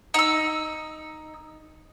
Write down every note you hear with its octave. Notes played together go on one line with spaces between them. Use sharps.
D#4 E6